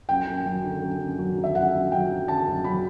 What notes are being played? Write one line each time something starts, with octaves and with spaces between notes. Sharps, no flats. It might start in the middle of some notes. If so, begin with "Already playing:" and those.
F#2 G5
F#2
F#3
D3
F#2
F#2
F#3
D3
E5
F#2 F#5
F#2
F#3 G5
D3
F#2 A5
F#2
F#3 B5